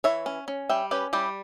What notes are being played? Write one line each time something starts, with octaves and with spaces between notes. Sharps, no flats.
E3 C#5 E5
C#4
C#4
G3 E5 G5
C#4 G4 B4
G3 E4 G4